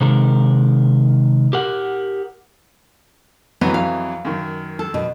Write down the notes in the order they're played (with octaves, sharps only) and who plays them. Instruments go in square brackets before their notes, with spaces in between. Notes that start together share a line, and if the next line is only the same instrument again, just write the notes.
[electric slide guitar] C3 D#3 G#3 A#4
G4 A#4 F#5
[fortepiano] F2 E3 F#3 [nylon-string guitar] B3
[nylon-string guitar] F5
[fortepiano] F#2 D#3
[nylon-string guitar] A4
B2